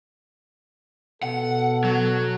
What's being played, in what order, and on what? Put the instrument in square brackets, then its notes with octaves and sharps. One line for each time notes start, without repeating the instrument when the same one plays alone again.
[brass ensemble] B2 A4 [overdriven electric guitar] F#5
[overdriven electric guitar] F#3